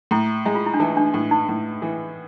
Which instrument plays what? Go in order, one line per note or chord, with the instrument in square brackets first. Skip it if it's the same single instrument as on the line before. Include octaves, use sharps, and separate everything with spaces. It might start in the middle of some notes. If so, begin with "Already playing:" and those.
[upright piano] A2 [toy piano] E4
[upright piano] G#3 [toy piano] E4
[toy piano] F4
E4
D4
[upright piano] E3 [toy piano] D#4
[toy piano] D4
[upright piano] A2 [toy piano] D4
[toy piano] D#4
[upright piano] A2
E3